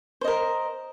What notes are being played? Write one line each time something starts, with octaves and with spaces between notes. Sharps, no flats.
A#4 C5 D#5